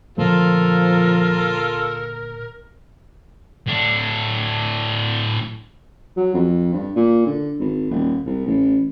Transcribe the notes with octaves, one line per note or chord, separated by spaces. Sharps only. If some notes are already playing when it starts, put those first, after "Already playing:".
A#2 D3 F3 A3 F4 A4 A#4
A2 D4
F#3
F2
G2
A#2
D3
G#1
D#1
C2
A1